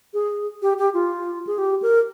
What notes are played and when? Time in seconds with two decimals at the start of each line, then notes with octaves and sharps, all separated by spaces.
0.14 G#4
0.62 G4
0.78 G4
0.94 F4
1.47 G#4
1.58 G4
1.82 A#4